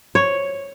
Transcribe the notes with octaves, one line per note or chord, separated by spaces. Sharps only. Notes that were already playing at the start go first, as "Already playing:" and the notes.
C#5